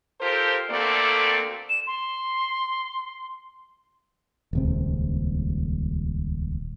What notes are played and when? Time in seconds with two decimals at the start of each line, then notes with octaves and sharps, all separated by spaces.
0.21 F4 G4 A4 A#4 C5
0.70 D2 A3 A#3 C4 A4 D5
1.69 E7
1.87 C6
4.53 D#1 C#2 C4